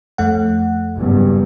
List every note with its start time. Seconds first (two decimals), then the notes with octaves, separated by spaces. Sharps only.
0.18 F2 A3 F#5
0.95 F#1 E2 G2